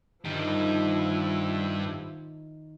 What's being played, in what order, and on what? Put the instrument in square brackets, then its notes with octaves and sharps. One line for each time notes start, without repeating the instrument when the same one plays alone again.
[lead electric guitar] G2 G3 [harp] D#3 [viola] F3 E4